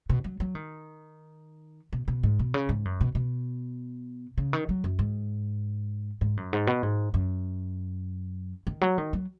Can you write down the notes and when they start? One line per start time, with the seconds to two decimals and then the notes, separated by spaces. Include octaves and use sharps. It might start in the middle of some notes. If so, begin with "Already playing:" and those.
0.09 B2
0.24 F#3
0.40 F#3
0.55 D#3
1.93 B2
2.08 B2
2.23 G#2
2.39 B2
2.54 C#3
2.69 G#2
2.85 F#2
3.01 B2
3.15 B2
4.38 C#3
4.53 D#3
4.69 F#3
4.84 F#2
4.99 G#2
6.21 G#2
6.37 F#2
6.53 G#2
6.67 B2
6.83 G#2
7.14 F#2
8.67 D#3
8.81 F#3
8.98 D#3
9.13 F#3